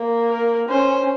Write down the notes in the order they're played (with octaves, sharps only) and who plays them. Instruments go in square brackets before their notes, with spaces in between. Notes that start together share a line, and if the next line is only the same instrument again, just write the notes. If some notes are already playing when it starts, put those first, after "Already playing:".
Already playing: [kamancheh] A#3
[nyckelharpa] A#4
[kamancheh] C#4 [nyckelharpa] C5